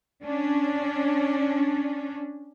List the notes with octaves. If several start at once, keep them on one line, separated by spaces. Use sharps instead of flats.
C#4 D4